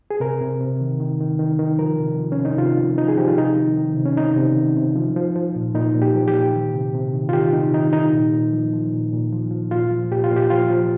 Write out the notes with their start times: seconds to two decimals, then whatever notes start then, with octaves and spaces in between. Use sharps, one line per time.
0.11 G#4
0.20 C3 A#4
0.41 C3
0.61 C3
0.81 D#3
1.00 D#3
1.20 D#3
1.39 D#3
1.59 D#3
1.79 F3 A#4
1.99 C3
2.19 F3
2.32 C#4
2.39 C3
2.45 D#4
2.58 C3 F4
2.78 F3
2.98 F3 D#4
3.08 G#4
3.18 F3 G4
3.28 F4
3.38 C3 D#4
3.57 D#3
3.77 D#3
3.96 C3
4.05 C#4
4.17 C3 D#4
4.36 C3
4.56 D#3
4.77 C3
4.96 F3
5.16 F3
5.36 F3
5.56 A#2
5.75 A#2 D#4
5.95 A#2
6.02 G4
6.15 F3
6.28 G4
6.34 A#2
6.54 D#3
6.75 C3
6.94 C3
7.13 D#3
7.29 F4
7.33 D#3 G4
7.53 C3 D#4
7.73 D#3 D#4
7.93 D#3 D#4
8.13 A#2
8.33 A#2
8.52 F3
8.73 F3
8.93 A#2
9.13 A#2
9.32 F3
9.51 F3
9.71 A#2 F4
9.91 F3
10.11 A#2 G4
10.24 F4
10.31 A#2
10.37 G4
10.50 F3 F4
10.70 F3